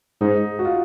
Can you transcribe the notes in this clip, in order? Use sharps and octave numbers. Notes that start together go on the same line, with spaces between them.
G#2 D#4
F#4
F4